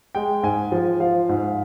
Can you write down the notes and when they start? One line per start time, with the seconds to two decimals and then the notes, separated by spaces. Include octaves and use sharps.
0.15 G#3 G5
0.43 G#2 G#5
0.72 F3
1.00 F3 F5
1.29 G#2